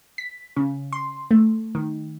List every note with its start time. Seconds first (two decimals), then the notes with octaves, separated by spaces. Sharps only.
0.18 B6
0.56 C#3
0.93 C6
1.31 A3
1.75 D#3